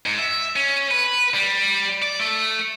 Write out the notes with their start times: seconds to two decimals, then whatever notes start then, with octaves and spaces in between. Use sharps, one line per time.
0.06 G#2
0.19 E5
0.56 C#4
0.91 B4
1.35 G3
2.02 D5
2.20 A3